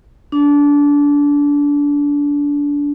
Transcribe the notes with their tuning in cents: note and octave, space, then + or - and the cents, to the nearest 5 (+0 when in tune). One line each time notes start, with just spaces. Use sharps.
D4 -25